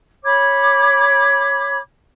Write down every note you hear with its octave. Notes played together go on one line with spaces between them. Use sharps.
C#5 B5 D6 G#6